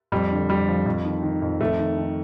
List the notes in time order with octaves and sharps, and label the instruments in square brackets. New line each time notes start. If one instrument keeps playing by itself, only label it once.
[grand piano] F2 G3
D3
F2 G3
F3
F2
D#3
D#3
F2
F2 A3
D#3
D#3